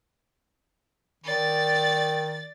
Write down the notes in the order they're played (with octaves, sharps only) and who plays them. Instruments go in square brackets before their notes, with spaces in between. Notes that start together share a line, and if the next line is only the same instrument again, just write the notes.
[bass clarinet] D#3 [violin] D5 A6